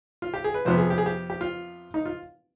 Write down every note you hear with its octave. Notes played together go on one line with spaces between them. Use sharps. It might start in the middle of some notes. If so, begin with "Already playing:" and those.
F4
G4
G#4
B4
F2 C3 F3 B3 C5
G#4
G4
G#4
G4
G4
F4
D#4
F4